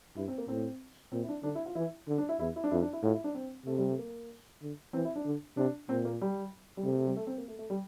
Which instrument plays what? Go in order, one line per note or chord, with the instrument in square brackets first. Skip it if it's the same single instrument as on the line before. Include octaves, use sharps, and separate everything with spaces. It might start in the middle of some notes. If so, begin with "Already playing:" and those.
[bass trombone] G2 [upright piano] E4
[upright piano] C4
A#3
[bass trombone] A2 [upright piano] C4
[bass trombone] A#2 [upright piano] C4
[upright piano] E4
D4
[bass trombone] D3 [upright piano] D4
[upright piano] E4
F4
[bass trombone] E3 [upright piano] E4
[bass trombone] D3
[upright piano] D4
E4
[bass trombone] E2 [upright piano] E4
[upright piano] E4
D4
[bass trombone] F2 [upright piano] E4
[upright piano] D4
E4
[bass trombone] A2 [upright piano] F4
[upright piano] E4
D4
C4
[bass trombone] C3 [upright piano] A3
[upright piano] G3
A3
A#3
[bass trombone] D3
[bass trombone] E3 [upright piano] C4
[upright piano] E4
D4
[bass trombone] D3
[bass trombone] C3 [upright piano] D4
[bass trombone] A#2 [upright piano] C4
[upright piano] A#3
G3
G3
[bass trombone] C3 [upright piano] A3
[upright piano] A3
G3
A3
C4
A#3
A3
A3
G3